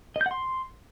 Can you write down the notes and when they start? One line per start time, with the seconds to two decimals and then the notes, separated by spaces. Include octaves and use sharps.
0.16 D#5
0.21 G6
0.26 F#5
0.31 C6